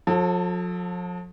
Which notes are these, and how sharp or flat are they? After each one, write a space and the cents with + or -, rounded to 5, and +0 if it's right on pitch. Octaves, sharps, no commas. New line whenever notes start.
F3 +45 A4 +0